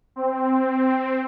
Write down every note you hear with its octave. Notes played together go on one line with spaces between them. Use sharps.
C4